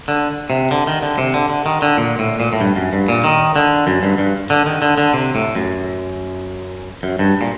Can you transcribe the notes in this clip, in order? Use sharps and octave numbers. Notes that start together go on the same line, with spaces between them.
D3
C3
D3
D#3
D3
C3
D3
D3
D#3
D3
A#2
A2
A#2
A2
G2
F#2
G2
A#2
D#3
D3
F#2
G2
G2
D3
D#3
D3
D3
C3
A2
F#2
F#2
G2
A#2